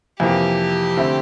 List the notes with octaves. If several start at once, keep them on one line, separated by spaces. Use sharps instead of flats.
F2 C3 E3 A#3 G4
D3 A3 C4 E4